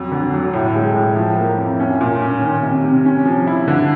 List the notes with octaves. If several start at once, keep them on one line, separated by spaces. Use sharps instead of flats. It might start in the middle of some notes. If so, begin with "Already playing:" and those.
Already playing: F2 F#3
D3
F#3
A2
G#3
A2
F3
A#3
F2
C#4
A#2
C#4
D#3
C3
C3
C#4
F3
E4
D3